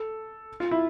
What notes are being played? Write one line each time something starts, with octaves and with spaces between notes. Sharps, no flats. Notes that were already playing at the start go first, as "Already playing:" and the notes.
Already playing: A4
F4
E4